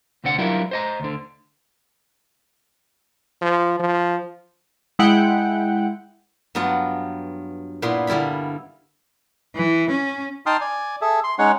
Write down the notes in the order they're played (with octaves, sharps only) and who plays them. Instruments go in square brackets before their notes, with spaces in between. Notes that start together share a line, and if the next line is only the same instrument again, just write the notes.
[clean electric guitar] D2 C3 C4 D4 F#5
F#3 G3 D4 E4 F4 A#4
C5 D#5 A#5
D2 D3
[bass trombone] F3
F3
[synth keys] G#3 E4 F#5 G5
[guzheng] G2 F#3 B3 F4 F#5
A#2 B3 E4 C6
D3 G3 E4 F4 B5
[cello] E3
C#4
[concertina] D#4 G5 A5 C6 D#6 F6
D5 G#5
G#4 A4 E5
C6
G#3 C#4 D#4 C#5 F#5